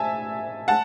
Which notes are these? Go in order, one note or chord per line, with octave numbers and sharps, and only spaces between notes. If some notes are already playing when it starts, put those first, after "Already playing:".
Already playing: E5 G#5 A5
F#5 A5